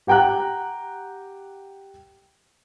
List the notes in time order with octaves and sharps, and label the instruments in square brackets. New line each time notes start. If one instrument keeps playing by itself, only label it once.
[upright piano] G4 F#5 G5 A#5 F#6